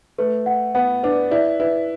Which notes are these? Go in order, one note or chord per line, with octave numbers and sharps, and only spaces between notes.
A3 B4
F#5
B3 F#5
D4 B4
E4 D5
E4 B4